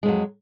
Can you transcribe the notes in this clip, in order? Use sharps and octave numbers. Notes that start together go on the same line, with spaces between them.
F2 F#3 G#3